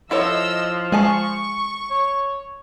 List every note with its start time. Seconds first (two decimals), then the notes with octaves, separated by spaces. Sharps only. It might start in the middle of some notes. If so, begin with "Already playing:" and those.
0.11 F3 E4 A4 C#5 D#5 E6
0.92 G#3 G#4 G#5 A5 C#6
1.90 C#5